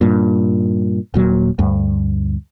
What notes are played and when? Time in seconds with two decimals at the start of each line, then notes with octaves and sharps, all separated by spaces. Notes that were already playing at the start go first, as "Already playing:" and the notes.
0.01 G2 A#2
1.14 D#1 A#2 F#3
1.59 D2 G2